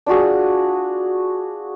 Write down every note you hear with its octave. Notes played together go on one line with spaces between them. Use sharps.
D4 F4 F#4 G#4